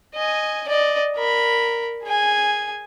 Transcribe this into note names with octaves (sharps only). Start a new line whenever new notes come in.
D#5 G#5
D5 D#5
A#4 B5
G#4 G#5